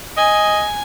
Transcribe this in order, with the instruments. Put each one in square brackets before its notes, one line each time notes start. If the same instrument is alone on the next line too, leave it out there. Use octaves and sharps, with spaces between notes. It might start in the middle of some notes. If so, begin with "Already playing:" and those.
[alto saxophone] D#5 [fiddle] G#5